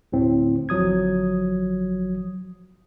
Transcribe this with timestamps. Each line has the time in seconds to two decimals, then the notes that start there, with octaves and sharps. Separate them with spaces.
0.12 D2 A2 C4
0.69 G1 F3 F#3 D#6 G#6